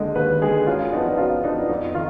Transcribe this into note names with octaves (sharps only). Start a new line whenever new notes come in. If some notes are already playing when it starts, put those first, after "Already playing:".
Already playing: D#2 D3 G#3 D#5
D#2 B4
D3 G#3 G#4
F#2 F4
F3 B3 D4 D#4
F#2 F4
F3 B3 D4 D#4
F2 D#4
D#3 F4